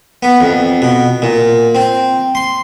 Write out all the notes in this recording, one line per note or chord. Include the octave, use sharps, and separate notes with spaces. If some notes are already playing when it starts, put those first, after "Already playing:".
B3
F2
B2
A#2
C4
C6